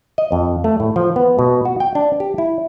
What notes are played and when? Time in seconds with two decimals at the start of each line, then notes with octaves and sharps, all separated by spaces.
0.18 D#5
0.32 F2
0.64 A3
0.80 A2
0.96 F3
1.16 B3
1.39 B2
1.65 F#4
1.80 G5
1.95 D4
2.20 G4
2.38 E4